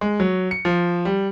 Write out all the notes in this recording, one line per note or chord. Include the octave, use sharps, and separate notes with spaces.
G#3
F#3
C#7
F3
G3